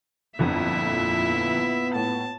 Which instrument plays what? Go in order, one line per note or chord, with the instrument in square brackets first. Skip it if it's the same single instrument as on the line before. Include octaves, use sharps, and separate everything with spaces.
[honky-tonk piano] G1 F2 D3 [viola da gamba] A#2 E4 F4 [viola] E5
[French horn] B3
[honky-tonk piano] A2 [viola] A5